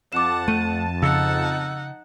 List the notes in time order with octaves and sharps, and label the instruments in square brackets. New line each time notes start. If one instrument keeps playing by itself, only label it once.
[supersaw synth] F2 A5 [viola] F#5 [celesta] D6 E7
[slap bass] A3 [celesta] D#7
[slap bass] C#3 [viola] D#4 F#5 [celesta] E6 C#7